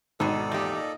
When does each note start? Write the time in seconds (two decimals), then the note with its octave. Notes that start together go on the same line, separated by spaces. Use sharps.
0.20 G#1 B2 D#4 A4 D5
0.52 E2 A#2 D#4 G4